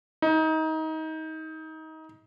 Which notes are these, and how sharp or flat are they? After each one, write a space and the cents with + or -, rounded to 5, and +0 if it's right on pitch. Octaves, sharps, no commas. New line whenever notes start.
D#4 +25